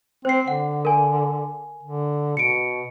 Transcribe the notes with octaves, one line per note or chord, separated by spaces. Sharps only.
C4 C5 C7
D3 F#5
A#4 G#5
D3
B2 C#7 D7